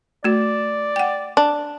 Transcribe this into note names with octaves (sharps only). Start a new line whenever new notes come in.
A3 F#4 D5
F#5 G5
D4